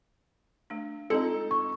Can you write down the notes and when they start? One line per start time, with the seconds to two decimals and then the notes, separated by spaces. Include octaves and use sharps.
0.70 A3 D4
1.10 G#3 C4 D#4 F4 A4
1.51 C#6